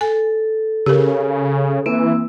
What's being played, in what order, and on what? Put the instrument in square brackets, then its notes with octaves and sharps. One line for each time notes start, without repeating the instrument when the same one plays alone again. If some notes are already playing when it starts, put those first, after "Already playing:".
[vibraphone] A4 [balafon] G#5
[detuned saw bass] C#3 [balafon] G4 A#4
[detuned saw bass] E3 [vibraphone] A#3 C4 E6